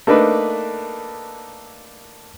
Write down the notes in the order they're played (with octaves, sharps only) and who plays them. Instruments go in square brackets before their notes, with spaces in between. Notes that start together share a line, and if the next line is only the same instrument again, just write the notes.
[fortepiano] A3 A#3 D4 D#4 B4